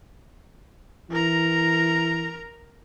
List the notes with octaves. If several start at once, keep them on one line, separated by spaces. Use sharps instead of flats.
E3 A#4 A#5